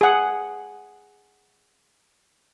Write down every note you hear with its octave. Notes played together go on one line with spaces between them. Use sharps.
G#4 F#5